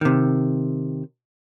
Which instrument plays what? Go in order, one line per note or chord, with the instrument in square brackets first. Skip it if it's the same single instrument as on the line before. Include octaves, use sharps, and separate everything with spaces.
[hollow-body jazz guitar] C3 D#3